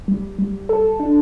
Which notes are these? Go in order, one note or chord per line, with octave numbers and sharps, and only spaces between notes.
G3
G3
A4
D4